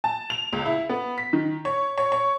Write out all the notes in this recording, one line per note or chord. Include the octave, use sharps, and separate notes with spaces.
A5
F7
C#2
E4
B3
B6
D#3
C#5
C#5
C#5